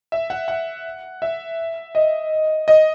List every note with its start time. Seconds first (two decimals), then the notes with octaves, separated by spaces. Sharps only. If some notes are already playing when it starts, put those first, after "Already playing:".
0.12 E5
0.30 F#5
0.48 F#5
1.22 E5
1.95 D#5
2.68 D#5